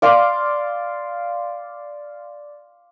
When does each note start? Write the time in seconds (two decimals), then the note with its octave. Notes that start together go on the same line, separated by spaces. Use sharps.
0.02 D5 F5 C6 D6